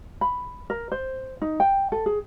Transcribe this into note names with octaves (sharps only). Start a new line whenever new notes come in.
B5
A#4
C5
D#4
G5
A4
G#4